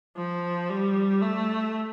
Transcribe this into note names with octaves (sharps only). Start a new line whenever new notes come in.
F3
G3
A3